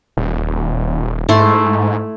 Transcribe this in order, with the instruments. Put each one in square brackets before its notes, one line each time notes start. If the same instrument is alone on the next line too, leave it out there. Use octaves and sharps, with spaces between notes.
[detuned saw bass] D#1
[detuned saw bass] G#2 [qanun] A3 E4 C6